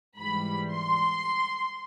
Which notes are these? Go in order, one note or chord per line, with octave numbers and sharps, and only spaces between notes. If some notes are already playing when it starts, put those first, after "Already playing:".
G#2 E3 G3 B5
C6